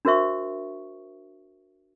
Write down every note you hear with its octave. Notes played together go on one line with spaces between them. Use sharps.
D4 F#4 A#4 C5 E5 C#6